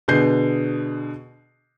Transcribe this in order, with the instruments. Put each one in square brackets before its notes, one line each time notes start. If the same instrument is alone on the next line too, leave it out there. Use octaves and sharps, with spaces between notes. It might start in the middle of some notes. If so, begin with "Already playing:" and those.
[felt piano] B2 D3 G#4 G6 C7